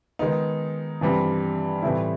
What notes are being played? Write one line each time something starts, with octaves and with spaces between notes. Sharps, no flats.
D#3 G#3 B3 D#4
G2 E3 G3 C4
A2 E3 G3 C4 E4